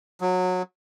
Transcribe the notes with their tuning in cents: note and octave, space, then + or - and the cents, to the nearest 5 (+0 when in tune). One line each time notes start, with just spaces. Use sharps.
F#3 -20